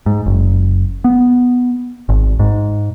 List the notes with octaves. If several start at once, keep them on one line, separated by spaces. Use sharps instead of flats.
G#2
F#1
B3
G#1
G#2